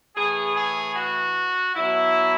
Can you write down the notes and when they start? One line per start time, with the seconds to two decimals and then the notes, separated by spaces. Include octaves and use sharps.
0.16 A2 E3 G#4
0.56 G#4
0.96 F#4
1.76 B2 F#3 E4